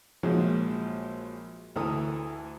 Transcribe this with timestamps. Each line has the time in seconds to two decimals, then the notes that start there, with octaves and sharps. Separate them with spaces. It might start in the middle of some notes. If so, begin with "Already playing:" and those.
0.23 A#1 A#2 F3 F#3 G#3
1.76 D2 E3 A4 A#5 D#6